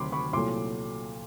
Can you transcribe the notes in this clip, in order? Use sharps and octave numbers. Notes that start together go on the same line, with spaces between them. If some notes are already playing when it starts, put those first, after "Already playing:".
Already playing: D2 C3 D#3 F#3 B5 C6 D6
B5 C#6
C2 A#2 F#3 A3 C6 D6